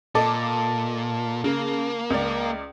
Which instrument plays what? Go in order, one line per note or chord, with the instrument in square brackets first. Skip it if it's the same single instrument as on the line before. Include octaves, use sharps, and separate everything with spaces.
[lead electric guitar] A#2 [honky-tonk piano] A4 D#5 D6 [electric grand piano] A5
[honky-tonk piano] C#3 [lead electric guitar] A#3
[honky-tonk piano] C#2 D5